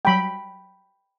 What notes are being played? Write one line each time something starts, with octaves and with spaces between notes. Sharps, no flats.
F#3 G3 G5 B5